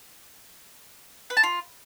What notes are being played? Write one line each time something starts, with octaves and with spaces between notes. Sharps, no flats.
B4
A5
F4